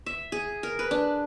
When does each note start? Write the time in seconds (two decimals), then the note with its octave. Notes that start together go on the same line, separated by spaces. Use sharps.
0.06 E5
0.32 G#4
0.63 A#4
0.79 B4
0.91 D4